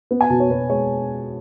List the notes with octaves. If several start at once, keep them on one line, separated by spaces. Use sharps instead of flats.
B3
G#5
B2 A5
C#5
B2 B4
G#3 C#5